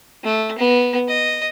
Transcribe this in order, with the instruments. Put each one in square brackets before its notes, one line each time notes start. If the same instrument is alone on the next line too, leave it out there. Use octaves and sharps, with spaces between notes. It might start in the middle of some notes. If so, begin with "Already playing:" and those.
[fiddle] A3
B3
D#5